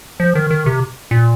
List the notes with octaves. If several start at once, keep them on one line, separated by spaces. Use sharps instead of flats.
F3
D#3
D#3
C3
A#2